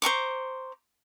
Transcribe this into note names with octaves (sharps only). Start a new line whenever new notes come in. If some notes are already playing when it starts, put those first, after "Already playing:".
C5 A#5 C#6 D6